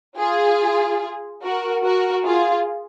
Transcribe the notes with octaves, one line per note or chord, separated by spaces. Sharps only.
F4 G#4
F#4 A#4
F#4 A#4
F4 G#4